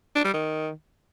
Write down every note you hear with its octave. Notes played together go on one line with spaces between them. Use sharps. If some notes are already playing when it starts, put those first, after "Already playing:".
D4
G3
D#3